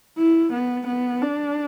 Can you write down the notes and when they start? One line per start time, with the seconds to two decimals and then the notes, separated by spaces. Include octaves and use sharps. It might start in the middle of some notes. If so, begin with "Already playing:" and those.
0.18 E4
0.53 B3
0.87 B3
1.22 D4